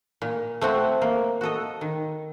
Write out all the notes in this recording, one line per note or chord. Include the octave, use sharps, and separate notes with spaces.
A#2
A3 C4 F#4
A#3
F#4 A4 D#5
D#3